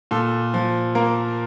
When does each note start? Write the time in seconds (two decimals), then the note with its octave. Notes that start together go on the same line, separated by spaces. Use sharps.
0.11 A#2 A4
0.54 F3
0.95 A#3 A#4